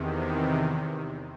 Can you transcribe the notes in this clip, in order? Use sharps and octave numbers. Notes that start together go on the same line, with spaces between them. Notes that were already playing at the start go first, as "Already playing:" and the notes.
Already playing: E2 C3 D#3